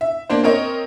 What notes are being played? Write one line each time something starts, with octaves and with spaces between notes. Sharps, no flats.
E5
A#3 D4 C5
C4 A#4 C#5 D#5